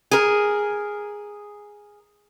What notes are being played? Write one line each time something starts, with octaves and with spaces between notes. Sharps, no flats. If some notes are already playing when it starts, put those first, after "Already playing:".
G#4 A#4